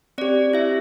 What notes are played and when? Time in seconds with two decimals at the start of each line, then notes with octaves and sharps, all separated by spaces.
0.18 C4 G4 D5
0.53 E4 E5